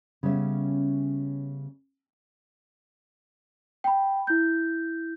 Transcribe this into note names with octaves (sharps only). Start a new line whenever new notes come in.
C#3 G3 B3 C#4 E5
G5 B5
E4 G6